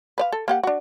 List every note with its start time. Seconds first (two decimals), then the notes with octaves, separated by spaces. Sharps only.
0.18 B4 D5 F5
0.32 A4
0.48 A#3 G4 F#5
0.63 D4 F#4